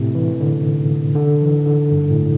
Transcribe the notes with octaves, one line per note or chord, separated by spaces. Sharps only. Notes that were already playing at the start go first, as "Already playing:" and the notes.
Already playing: A2 C3
E3
D3
D3
E3
D3
G2
A2